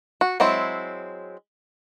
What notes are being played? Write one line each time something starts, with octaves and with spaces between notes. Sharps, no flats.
F#4
F#3 G#3 C4 E4